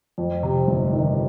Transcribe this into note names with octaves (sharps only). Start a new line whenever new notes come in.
F2
C3
G1
D#3